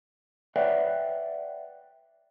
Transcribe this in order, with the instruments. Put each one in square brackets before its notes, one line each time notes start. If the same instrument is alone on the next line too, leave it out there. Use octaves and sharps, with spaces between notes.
[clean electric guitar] B4 C#5 D5 E5 F#5 G5